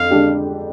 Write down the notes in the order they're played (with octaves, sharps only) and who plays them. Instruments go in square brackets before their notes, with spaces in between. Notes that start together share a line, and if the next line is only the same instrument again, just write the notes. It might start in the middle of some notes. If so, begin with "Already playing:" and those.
Already playing: [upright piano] F2 D3 [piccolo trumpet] F5
[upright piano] D3 G#3 D4 G4